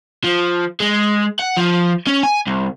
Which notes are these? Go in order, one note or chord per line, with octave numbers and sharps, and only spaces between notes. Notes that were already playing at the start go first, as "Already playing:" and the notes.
F3
G#3
F#5
F3
C#4
G#5
C2